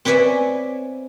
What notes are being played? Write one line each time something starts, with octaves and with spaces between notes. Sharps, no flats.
C4 B4 C#5 D5 E5 G#5